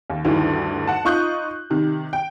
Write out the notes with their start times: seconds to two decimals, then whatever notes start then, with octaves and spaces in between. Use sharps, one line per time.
0.10 D#2
0.25 D2 G2 D#3 E3
0.87 F#5 A5
1.05 D#4 F4 C#6 D#6 F#6 G6
1.70 C3 D#3
2.13 G5